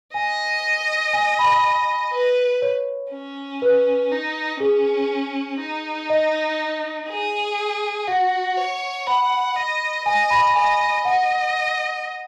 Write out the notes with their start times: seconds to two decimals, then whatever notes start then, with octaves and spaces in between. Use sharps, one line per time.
0.14 D#5 G#5
1.13 G#5
1.39 B5
2.13 B4
2.62 C#5
3.11 C#4
3.62 B4
4.11 D#4
4.60 C#4 G#4
5.60 D#4
6.10 D#5
7.08 G#4
8.08 F#4 F#5
8.57 C#5
9.07 F#5 B5
9.57 D#5
10.05 D#5 G#5
10.30 B5
10.55 D#5 G#5
11.05 D#5 F#5